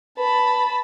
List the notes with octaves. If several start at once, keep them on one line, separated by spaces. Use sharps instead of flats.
B4 A5 B5